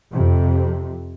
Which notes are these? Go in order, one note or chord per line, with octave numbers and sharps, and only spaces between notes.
F2 C3